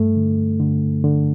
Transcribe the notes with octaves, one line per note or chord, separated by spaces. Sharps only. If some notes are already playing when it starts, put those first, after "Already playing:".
Already playing: G2 A3
D3
D3
D3